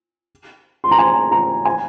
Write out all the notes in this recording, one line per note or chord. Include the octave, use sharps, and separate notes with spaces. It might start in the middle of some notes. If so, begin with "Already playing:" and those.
C6
A#5
G#5
A#5
G#5